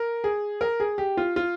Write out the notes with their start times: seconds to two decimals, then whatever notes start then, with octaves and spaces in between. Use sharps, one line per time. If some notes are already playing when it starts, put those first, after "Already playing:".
Already playing: A#4
0.24 G#4
0.61 A#4
0.80 G#4
0.98 G4
1.17 F4
1.36 F4